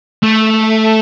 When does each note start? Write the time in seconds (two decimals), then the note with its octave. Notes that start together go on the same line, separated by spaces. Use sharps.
0.23 A3